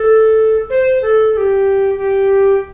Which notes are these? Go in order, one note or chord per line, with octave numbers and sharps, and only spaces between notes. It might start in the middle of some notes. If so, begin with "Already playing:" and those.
Already playing: A4
C5
A4
A4
G4
G4